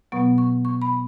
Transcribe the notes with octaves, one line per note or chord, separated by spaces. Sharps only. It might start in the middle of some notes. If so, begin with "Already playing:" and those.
B2 F#3 B3 C#6
C#6
C#6
B5